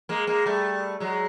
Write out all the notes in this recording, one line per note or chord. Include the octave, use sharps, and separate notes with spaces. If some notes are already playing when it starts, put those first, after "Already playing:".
G#3 A#3
G#3 A#3
G3 A3
F#3 G#3